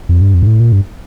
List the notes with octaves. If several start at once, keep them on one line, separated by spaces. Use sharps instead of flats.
F2
G2
F2
G2
A2
A#2
G2